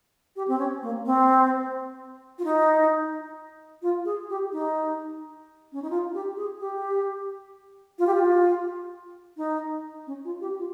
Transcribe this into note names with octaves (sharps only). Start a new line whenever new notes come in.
G4
C4
C#4
A#3
C4
F4
D#4
F4
G#4
G4
D#4
C#4
D#4
F4
G4
G#4
G4
F4
G4
F4
D#4
C#4
F4
G4
F4